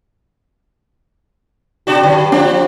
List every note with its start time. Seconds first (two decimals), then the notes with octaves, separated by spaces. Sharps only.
1.87 B2 D4 F#4
2.03 G2 D3 F#3
2.32 F3 D4